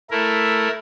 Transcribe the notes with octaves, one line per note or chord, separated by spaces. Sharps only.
A3 E4 A#4